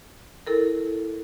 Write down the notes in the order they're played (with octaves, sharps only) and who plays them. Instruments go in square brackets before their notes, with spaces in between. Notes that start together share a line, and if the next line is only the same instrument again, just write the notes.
[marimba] E4 A4 A#4